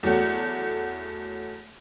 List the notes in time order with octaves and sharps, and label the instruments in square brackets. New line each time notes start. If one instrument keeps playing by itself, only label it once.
[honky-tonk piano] E2 F#3 A3 F#5